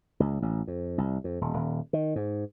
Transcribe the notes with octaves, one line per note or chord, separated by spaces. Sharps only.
C#2
A1
F2
C2
F2
D#1
D#1
D#3
G#2